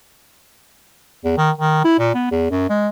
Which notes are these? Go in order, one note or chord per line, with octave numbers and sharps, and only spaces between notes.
E2
D#3
D#3
E4
A#2
B3
E2
F#2
G#3